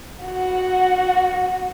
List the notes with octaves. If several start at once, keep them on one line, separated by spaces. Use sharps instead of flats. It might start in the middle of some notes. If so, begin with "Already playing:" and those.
F#4 F#5